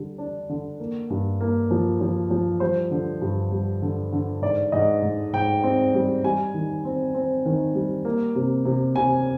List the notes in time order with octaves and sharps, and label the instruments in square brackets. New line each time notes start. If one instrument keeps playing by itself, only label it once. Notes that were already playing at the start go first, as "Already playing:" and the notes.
Already playing: [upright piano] D3 G3
D4
D3
A#3
G2
A#3
F3
F3
F3
G3 C5
D3
G2
G3
D3
D3
G#2 D5
G#2 D#5
G#2
G#2 G5
C4
G3
G3 G#5
D#3
C4
C4
D#3
G3
A#3
C3
C3
C3 G#5